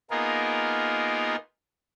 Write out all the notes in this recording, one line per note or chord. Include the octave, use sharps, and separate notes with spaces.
A#3 B3 D#4 F4 G#4 A#4